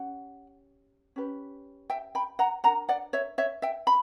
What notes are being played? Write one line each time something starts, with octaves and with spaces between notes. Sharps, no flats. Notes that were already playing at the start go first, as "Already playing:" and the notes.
Already playing: C#4 G4 F#5
C#4 G4 B4
E5 G5
G5 B5
F#5 A#5
D4 A#4 F#5 A#5
D5 F#5
C#5 E5
C#5 E5
E5 G5
B5